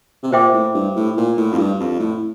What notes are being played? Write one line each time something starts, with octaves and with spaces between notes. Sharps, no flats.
C3
A#2 C5 E5 G5 D6
A2
G2
A2
A#2
A2
F2
G2
F2
A2